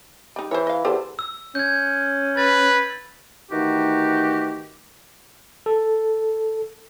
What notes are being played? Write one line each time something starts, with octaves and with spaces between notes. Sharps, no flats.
G3 D#4
E3 C5 C#5
D#5 F5
E2 G4 A4 C5
E6
C#4 G6 G#6
B4 A6
D#3 E3 A3 D#4 F#4 G4
A4